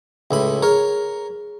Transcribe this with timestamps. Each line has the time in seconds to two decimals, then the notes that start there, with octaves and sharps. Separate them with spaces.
0.31 C#2 A2 B5
0.62 G#4 A#4 C#5